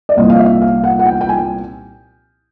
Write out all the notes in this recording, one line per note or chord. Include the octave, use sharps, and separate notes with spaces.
D5
C2 A#2 F3 D#5
F5
E5
F5
F#5
F#5
G5
G5
G#5